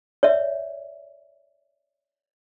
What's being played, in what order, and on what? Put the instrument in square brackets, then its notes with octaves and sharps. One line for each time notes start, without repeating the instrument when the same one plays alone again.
[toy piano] C#5 D5 E5